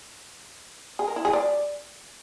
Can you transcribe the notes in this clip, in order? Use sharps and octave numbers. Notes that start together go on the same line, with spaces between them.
G#4
A#4
E4
G#4
D5